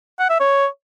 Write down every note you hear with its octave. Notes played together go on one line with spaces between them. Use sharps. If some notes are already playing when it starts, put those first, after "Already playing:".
F#5
E5
C#5